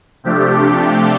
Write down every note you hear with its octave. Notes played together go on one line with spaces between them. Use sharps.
C3 F3 A3 D4 G4